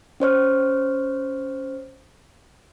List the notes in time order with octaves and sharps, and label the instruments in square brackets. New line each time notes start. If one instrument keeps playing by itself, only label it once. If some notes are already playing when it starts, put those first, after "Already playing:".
[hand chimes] C#4 C5 C#5 F6